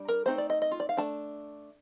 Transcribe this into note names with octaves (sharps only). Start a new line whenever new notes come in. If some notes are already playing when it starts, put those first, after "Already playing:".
Already playing: G3 D4
A#4
A3 C4 D#4 C5
D5
D#5
D#5
F4
D5
F5
A3 D4 A5